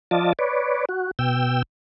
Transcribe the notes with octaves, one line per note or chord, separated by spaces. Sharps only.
F3 F4 D5 D#5 A5
B4 C#5 D5
F#4
B2 G5 E6